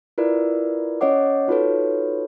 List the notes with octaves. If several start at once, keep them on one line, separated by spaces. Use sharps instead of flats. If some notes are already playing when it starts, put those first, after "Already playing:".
E4 F4 A#4 B4 D5
C#4 C#5 D#5 F#5 D6
D#4 F4 F#4 A4 B4 C#5